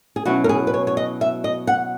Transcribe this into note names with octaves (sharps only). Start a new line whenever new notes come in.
G#4
B2 F#3 C#4 E4 F#4
A#4
G#4
B4
C#5
C#5
D#5
E5
D#5
F#5